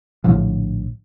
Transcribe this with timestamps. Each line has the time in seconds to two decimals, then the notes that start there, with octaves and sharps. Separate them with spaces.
0.24 A#1 A2 D3 F3